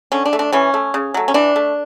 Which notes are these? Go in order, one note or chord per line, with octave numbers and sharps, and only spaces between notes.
D3 C#4
D4
A3
D4
E3 C#4
A3
C#3
F#3 A3
C#4
E3 D4
A3